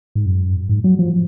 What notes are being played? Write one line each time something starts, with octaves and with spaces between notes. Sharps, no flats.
G#2
F#2
G#2
F#3
F3